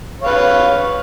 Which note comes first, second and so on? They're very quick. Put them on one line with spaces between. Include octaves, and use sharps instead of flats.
C#5 F5 B4